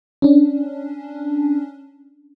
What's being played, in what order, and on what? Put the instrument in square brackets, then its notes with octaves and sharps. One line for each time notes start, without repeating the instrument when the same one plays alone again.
[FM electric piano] C#4 D4